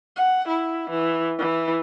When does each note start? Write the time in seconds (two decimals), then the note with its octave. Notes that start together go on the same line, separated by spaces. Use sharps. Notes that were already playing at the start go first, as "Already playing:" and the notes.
0.16 F#5
0.48 E4
0.90 E3
1.39 E3